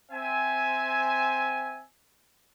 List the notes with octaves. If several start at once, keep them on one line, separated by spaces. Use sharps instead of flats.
C4 E5 G#5